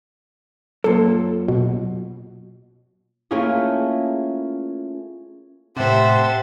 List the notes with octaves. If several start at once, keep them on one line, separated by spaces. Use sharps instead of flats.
F#2 A#2 A4
B2
A3 A#3 C#4 E4 F4 G#4
A2 C3 G4 C5 E5 F#5 A5